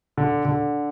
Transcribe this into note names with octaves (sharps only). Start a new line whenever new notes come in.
D3
D3